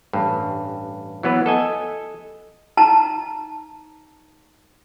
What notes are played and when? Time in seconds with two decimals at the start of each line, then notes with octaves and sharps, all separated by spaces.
0.13 A1 G2
1.23 E3 F#3 B3 B4
1.46 A4 D#5 G#5
2.77 D#4 A5 A#5